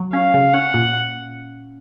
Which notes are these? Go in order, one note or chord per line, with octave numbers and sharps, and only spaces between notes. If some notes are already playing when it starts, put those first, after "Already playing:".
Already playing: F#3
C#4 F5
C#3
C#4 F#5
A#2